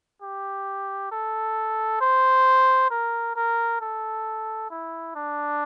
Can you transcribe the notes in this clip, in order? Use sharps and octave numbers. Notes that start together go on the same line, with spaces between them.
G4
A4
C5
A#4
A#4
A4
E4
D4